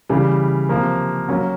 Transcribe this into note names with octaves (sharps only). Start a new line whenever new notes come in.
C#3 E3 G3
C3 F3 A#3
F#3 A#3 C#4